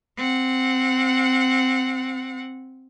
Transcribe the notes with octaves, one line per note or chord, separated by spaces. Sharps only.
C4 F#5